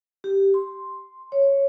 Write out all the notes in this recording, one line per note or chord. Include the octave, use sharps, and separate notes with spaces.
G4
C6
C#5